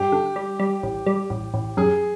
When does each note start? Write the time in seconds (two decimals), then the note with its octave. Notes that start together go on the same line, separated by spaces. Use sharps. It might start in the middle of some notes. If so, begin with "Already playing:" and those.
Already playing: G2 G4
0.12 D3
0.36 G3
0.59 G3
0.83 A1
1.06 G3
1.30 A1
1.54 A1
1.77 F#2 G#4